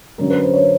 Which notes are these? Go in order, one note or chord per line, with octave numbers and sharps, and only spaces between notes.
F#2 D3 F#3 A#4
B4
C5
C#5